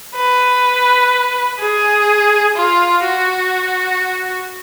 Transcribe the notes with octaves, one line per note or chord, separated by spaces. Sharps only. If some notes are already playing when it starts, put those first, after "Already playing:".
B4
G#4
F4
F#4